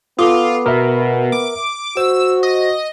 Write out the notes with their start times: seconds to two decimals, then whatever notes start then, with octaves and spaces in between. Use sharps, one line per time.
0.19 B3 F4 A4 D6 D#6
0.66 B2 A#4 E5
1.32 D6
1.97 F#4 C5 E6
2.43 D#5